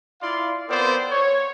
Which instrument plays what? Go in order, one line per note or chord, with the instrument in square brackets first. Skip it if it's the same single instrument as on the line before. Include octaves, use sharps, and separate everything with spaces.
[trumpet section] E4 F4 D5 F5 C6
B3 C4 F4 A#4 C5 D5
C#5